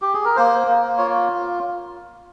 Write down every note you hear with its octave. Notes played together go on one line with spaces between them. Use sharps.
G4
G#4
A#4
A#3 C5
A#3
F4 C#5